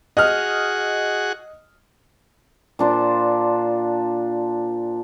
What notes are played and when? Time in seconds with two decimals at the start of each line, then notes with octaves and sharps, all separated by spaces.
0.17 F#4 G#4 D#5 F#5 F6
2.79 A#2 D4 C5